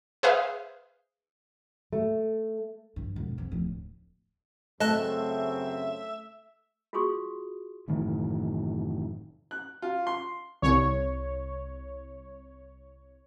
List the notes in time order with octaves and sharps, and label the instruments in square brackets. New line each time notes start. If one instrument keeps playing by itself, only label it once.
[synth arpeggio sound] G#4 B4 C5 E5 F5
[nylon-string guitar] A3
[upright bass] G2
E1
F2
D1
[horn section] F#2 C#3 C4 [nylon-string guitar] A3 [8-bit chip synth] D#5 A5 F#6 [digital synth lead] E5
[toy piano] F4 F#4 G#4 C6 C#6 D#6
[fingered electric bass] F#1 A2 D#3 E3
[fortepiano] F#6
F4
C6
[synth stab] C2 C#5